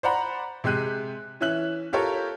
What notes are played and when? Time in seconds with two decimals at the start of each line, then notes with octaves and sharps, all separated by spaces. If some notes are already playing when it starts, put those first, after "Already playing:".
0.03 C5 D5 F#5 A#5 B5
0.64 C3 G#3 G4 F#6 D#7
1.40 E3 C#4 E5 F#6 F#7
1.93 F4 G4 A4 A#4 C#5